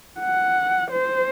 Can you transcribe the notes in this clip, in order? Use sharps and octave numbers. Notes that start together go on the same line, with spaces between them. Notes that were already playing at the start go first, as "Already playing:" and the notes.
F#5
C5